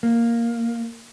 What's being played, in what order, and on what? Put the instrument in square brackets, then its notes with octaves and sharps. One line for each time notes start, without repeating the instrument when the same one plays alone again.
[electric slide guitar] A#3